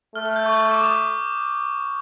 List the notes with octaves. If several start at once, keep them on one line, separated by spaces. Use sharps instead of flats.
A3 F6
F6
G6
C#6
C#6
D6
D#6